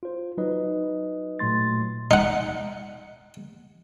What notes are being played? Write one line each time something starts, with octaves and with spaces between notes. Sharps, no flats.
F4 C5
F#3 D#4 B4 D#5
A#2 F#3 A3 C6 A6
D#4 F#5